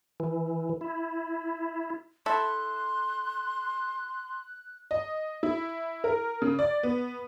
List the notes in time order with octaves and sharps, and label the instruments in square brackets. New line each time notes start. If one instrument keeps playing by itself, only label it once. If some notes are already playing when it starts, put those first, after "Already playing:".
[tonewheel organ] E3
E4
[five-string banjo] E4 A4 E5 [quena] C6 [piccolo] F#6
[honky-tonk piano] D#5
E4
A#4
C#3
D5
B3